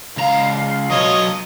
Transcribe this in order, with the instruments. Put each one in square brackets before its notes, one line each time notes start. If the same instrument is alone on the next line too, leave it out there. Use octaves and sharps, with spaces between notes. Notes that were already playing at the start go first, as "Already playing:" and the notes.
[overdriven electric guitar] C#2 A#5 [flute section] F5
[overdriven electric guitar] B2 F#3 [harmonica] F4 C#5 D#5